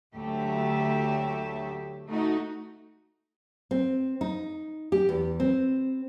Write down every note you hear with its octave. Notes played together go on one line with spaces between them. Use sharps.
D2 F#3 A3 G4 E5
A3 D#4 F#4
C4
D#4
G4
E2
C4